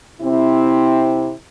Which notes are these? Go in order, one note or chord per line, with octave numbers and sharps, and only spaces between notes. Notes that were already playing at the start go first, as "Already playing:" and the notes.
C3 C4 E4